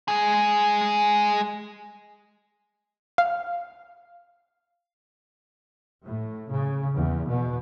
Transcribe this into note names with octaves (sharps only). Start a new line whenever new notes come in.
G#3 G#4
F5
A2
C#3
E2
B2